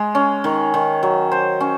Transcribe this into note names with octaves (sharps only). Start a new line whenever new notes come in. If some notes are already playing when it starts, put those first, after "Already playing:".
Already playing: G#3
C#4
D#3
D#3
F#3
C5
C#4